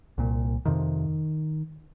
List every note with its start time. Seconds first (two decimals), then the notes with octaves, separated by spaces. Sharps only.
0.18 C2 A#2
0.65 F2 C3 D#3